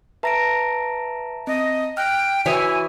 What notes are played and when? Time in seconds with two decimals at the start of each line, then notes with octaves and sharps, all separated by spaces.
0.23 B4 E5 A5 A#5 A#6 D7
1.47 C4 D#5
1.97 G5 F6 F#6
2.46 E3 E4 F#4 C#5 G#5 D#6